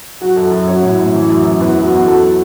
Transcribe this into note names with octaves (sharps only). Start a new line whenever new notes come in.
F#3 F#4
F#2 A4
F#2
F#3 C#5
A2
A2
E3
F#2
F#2
E2 B4
F#3
F#4
E2
F#3 A4